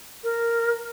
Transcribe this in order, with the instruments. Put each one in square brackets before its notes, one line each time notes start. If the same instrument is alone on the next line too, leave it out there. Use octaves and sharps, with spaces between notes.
[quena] A#4